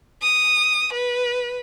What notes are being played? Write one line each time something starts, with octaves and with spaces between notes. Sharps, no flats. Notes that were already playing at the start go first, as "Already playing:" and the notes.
D#6
B4